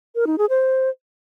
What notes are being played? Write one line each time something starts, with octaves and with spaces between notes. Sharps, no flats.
A#4
D#4
G#4
C5